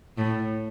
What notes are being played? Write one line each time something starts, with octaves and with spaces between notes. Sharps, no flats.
A2